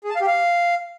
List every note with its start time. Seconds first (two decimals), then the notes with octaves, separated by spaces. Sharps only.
0.04 G#4
0.10 A5
0.16 F5
0.21 G4
0.27 F5